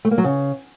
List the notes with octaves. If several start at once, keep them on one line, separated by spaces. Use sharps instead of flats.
A3
A#3
F#3
C#3